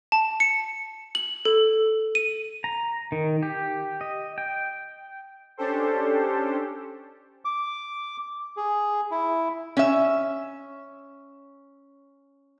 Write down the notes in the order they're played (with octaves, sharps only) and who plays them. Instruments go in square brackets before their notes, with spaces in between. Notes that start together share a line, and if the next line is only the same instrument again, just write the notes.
[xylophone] A5
C#7
F#7
A4
D#7
[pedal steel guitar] A#5
D#3
G4
D#5
G5
[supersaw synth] C#4 D4 G4 A4 C5
[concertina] D6
G#4
E4
[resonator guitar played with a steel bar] C#4 E5